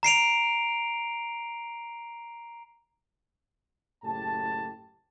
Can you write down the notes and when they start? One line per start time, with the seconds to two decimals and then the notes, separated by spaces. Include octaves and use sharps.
0.03 A#5 C7 D7 F7
4.03 F#1 A2 G4 A5